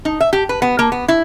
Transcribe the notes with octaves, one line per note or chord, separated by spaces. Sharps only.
D#4
E5
G4
B4
B3
A#3
B3
E4